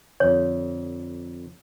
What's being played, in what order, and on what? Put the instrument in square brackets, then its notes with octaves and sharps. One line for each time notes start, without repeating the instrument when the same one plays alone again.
[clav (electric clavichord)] F2 D3 [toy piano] C#5